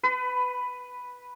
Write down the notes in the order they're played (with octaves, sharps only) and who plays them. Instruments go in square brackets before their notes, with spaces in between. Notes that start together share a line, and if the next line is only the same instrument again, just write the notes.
[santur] B4